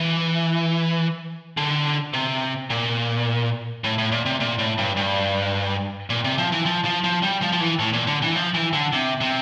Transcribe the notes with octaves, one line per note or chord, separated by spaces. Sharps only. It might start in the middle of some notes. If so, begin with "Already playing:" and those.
Already playing: E3
D3
C3
A#2
A2
A2
A#2
C3
A#2
A2
G2
G2
A#2
C3
F3
E3
F3
F3
F3
G3
F3
F3
E3
A2
A#2
D3
E3
F3
E3
D3
C3
C3